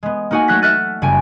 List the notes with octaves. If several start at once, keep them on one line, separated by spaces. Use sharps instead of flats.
G#3 B3
A#3 D#4 F#4 F#5 G#5
F#3 A3 F#6 G#6 A#6 B6
E5 F#5 F6 F#6 A6 D#7
F#1 G3 G#5 D7